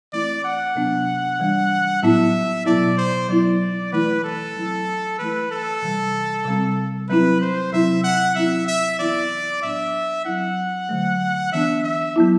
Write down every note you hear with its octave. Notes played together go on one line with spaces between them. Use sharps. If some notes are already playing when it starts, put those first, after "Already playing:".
E3 A3 C4 E4 D5
F#5
C3 F#3 B3 D4
E3 G3 D4
A2 F#3 B3 E4 E5
B2 F#3 B3 E4 D5
C5
F#3 B3 E4 D5
E3 A3 E4 B4
A4
F#3 C4 E4
E3 A3 E4 B4
A4
C3 E3 G3
C3 G3 C4
F#3 C4 E4 B4
C5
C3 F#3 C4 E4 E5
F#5
F#3 C4 E4 E5
E5
E3 B3 E4 D5
A2 F#3 B3 D4 E5
F#3 C4 E4 F#5
D3 F#3 A3
E3 B3 D4 E5
E5
F#3 B3 E4